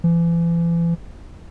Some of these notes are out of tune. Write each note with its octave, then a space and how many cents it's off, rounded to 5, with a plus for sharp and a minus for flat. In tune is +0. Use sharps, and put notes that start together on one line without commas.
E3 +40